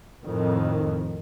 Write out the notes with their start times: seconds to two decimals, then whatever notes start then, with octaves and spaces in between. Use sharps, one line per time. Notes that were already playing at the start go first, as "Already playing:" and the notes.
0.22 F2 A2 D#3